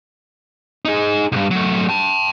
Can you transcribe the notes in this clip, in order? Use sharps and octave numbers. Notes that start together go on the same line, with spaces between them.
D#4 G#4
B1 G2
F#3 A3
G5 A5